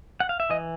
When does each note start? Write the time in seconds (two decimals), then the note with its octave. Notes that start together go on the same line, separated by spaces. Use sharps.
0.20 F#5
0.29 F5
0.40 E5
0.50 E3 D#5